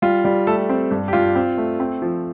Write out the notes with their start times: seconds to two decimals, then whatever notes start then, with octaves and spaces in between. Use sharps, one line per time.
0.02 G3 F4
0.25 G3
0.47 A3 A4
0.69 C4
0.91 G2
1.08 G4
1.13 G2 F4
1.35 C4
1.58 A3
1.80 C4
2.02 F3